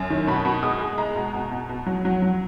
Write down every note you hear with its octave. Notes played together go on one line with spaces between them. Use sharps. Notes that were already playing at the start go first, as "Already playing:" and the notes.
Already playing: F#2
D#3
B2 B5
B2
G#3 D#6
G#3
G#3 A#5
B2
B2
B2
B2
F#3
F#3
F#3